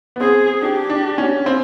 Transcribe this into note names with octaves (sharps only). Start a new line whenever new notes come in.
B3
C4 G#4
D4 G4
D4
C#4
C4